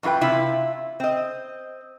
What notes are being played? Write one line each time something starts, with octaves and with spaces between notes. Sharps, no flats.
F#2 E3 F4 B4 G5
C3 E4 F4
C4 D#5